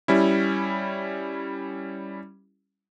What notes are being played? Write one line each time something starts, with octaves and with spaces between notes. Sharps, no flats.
G3 C#4 E4